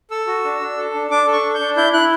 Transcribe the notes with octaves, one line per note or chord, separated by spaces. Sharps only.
A4 E6
F#4
D4
D4
A4
D4
D4 D6
A4
C#6
D4
G6
D4
E4 G6
E4 F#6